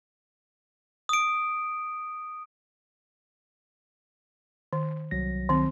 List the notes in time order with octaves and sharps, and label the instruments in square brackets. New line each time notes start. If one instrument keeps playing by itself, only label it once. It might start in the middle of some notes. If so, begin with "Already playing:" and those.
[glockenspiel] D#6 D7
[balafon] D#3
[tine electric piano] C2 F#3 A#6
[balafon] D#3 C4